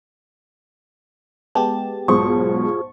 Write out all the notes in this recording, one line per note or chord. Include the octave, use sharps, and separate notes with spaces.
G#3 B3 G4 A5
B1 G#2 B2 F4 G#4 C5 C#6